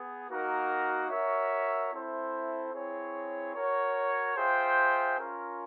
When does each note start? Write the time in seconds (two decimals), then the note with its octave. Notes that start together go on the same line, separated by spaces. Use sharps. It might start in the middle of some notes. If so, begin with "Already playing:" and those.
Already playing: B3 G#4
0.28 A#3 D#4 F#4 A#4
1.09 F#4 A#4 C#5 E5
1.91 C4 E4 A4 C5 E5
2.72 C4 E4 G#4 C#5
3.54 F#4 A#4 C#5
4.35 F4 G#4 C5 E5 G5
5.17 C#4 F4 A#4